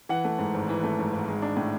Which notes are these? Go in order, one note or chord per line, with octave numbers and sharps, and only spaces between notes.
E3 F#5
A3
G#2
G#1
E3
A3
G#2
G#1
G#3
D4
A2